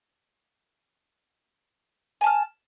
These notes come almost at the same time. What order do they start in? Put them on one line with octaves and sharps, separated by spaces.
G#5 A5 F6